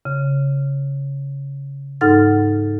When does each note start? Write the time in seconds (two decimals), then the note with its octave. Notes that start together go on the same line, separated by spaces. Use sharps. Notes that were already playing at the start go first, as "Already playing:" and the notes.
0.05 C#3
2.01 G#2 D#4 A4 F#5 F6 A6